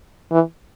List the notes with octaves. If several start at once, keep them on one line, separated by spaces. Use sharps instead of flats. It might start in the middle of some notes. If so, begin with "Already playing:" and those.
E3